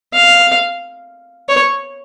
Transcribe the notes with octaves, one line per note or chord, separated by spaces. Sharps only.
F5
C#5